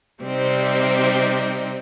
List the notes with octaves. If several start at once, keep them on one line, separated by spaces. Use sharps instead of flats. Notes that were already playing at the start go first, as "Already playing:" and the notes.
C3 G3 C4 D#4